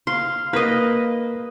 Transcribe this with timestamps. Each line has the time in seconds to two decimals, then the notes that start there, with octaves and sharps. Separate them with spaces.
0.07 F5 C6
0.53 A#3 B4 D#5